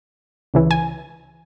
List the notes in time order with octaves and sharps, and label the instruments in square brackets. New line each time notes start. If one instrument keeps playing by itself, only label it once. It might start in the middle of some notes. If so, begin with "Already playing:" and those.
[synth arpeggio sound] C#2 C#3 E3
G#5